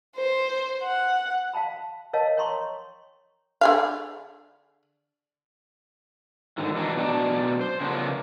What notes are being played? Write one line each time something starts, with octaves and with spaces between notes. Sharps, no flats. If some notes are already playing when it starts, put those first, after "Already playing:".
C5
F#5
F5 G5 A5 B5
A#4 C#5 D#5 F5 A5
C#5 G5 A#5 C6 C#6
D3 G#4 F5
G#2 D3 D#3
E3 F#3 D4 D#4
B2 F#3 D4 G4 D5 A5
C5
C#3 F3 A3 B3 D4 A#4